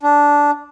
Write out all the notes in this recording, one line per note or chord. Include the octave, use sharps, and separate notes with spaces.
D4